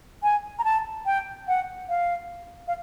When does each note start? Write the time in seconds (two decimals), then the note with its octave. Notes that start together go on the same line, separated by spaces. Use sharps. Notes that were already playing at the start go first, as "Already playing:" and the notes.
0.23 G#5
0.59 A#5
0.64 A5
1.06 G5
1.48 F#5
1.89 F5
2.68 F5